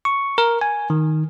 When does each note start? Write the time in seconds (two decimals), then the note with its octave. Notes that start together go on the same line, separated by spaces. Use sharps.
0.05 C#6
0.38 A#4
0.61 G#5
0.90 D#3